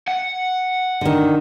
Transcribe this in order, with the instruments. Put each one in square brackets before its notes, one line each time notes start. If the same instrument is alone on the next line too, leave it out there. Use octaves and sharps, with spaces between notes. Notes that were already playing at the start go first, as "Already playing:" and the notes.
[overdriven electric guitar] F#5
[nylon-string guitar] D3 D#3